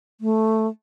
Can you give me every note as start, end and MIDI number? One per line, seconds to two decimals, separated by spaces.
0.21 0.67 57